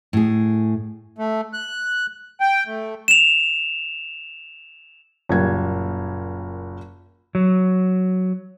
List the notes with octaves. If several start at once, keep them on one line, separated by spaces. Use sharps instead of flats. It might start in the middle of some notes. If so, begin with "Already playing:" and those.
A2 G#4
A3
F#6
G5
A3
E7 F7
F#1 A#2 G3 G#6
F#3